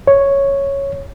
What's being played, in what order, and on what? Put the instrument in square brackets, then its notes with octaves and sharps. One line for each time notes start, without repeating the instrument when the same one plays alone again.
[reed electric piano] C#5